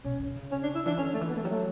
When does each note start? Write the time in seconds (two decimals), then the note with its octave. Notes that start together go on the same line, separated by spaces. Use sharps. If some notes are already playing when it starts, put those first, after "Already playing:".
0.04 B2 C#4
0.20 D3
0.36 C#3
0.52 C#4
0.63 D4
0.75 E4
0.86 E3 D4
0.97 D3 C#4
1.14 A3
1.21 E3
1.29 B3
1.37 A3
1.43 F#3 G3
1.50 A3